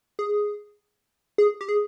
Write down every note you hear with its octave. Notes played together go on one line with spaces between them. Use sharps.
G#4
G#4
G4
G#4